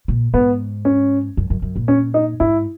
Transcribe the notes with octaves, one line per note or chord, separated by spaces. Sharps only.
A#2
G#2 B3
C#4
F#2
F#2
F#2
A#2
C#4
D#4
G#2 E4